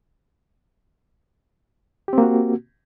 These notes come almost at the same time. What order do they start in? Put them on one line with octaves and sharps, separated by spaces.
G4 C4 A#3 F#4